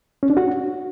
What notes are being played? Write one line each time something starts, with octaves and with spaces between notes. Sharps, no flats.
C#4
D4
F#4